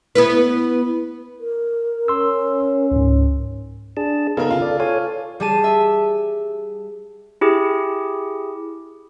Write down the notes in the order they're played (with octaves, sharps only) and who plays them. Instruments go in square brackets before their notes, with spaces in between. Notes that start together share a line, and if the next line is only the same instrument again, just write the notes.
[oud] B3 E4 B4
[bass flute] A#4
[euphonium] C#4 [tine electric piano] C6 E6
[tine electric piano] C#2 G#2
[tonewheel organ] D4 G#4 A5
[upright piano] C#3 A#4 [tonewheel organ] B3 D#4 A4
[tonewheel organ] C#3 [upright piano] F4
[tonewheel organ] A4 D5
[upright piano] F4 [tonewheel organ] A4 C#5 G#5
[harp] G3 G#4 A5 D#7
E5
[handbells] E4 G4 G#4